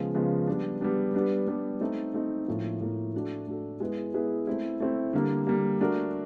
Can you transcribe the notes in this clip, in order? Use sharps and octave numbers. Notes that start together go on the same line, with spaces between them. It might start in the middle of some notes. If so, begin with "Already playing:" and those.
Already playing: C#3 F3 G#3 B3
C#3 F3 G#3 B3
G3 B3 D4
G3 B3 D4
G3 B3 D4
G3 B3 D4
A3 C4 D#4
A3 C4 D#4
A2 F3 A#3
A2 F3 A#3
A3 D4 F#4 A4
A3 D4 F#4 A4
G#3 B3 E4 G#4 B4
G#3 B3 E4 G#4 B4
A3 C4 E4
A3 C4 E4
D3 G3 A#3
D3 G3 A#3
A3 D4 F#4 A#4